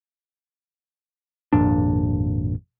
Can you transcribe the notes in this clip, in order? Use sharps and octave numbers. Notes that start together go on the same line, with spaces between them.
G#1 F2 A#2 D4